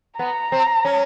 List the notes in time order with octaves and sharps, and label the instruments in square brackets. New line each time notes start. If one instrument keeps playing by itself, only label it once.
[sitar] B3 [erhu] A#5
[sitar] C4
C#4